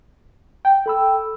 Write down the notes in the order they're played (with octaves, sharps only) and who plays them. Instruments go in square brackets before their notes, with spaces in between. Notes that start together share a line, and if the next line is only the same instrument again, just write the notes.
[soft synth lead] G5
[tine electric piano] A4 B5 E6